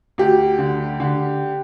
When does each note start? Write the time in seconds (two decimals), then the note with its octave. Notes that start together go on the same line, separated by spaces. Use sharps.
0.18 D2 G4
0.58 D3
1.00 D3